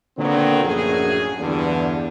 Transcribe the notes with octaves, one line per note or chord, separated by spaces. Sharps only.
A#2 D3 D#3 F#3 B3 C4
A#1 F#2 A2 D#4 F#4 G#4
E2 G2 D3